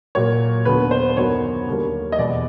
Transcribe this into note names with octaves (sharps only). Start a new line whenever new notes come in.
A#2 F#3 A#3 C#5
D#2 D3 F#3 B3 B4
C5
F#2 D#3 F#3 B3 C#5
D#2 D3 G3 A#3
D#5
E2 B2 G#3 B3 D5